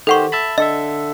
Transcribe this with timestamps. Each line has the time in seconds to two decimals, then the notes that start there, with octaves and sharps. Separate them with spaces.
0.07 D#3 G4 A4 C5 F#5 C#6
0.32 E5 A5 B5
0.58 D3 A4 D#5 E5